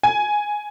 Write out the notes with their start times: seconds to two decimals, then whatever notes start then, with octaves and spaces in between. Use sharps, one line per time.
0.03 G#5